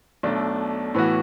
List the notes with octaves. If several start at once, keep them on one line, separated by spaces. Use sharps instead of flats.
B1 B2 A3 D4
A2 E3 B3 F#4